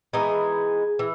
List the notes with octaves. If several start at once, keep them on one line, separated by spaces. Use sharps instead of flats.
E3 G#3 B3 D#4 G#4
E3